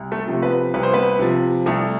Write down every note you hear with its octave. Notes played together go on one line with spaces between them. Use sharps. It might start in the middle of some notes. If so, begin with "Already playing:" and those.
Already playing: C2
A3 A4
C3 F3
B3 B4
C2 B4
C5
B3 B4
C3 F3
C2 A3 A4